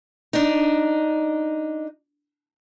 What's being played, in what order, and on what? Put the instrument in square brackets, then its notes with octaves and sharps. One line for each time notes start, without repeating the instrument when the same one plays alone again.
[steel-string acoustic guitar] D4 D#4